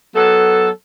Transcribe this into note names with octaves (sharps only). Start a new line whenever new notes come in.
F#3 B3 A4